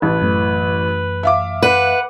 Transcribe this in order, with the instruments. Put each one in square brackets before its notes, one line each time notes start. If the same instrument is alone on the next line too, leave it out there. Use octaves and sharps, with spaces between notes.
[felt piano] A1 [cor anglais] B4 [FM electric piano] A5
[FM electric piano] F#2 E3 A3
[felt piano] E5 F5 D6
[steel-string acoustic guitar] B4 [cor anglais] F#5